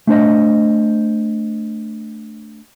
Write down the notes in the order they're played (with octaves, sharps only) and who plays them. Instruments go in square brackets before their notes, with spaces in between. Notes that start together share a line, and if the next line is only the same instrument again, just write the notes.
[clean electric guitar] A3 D4 C5 D#5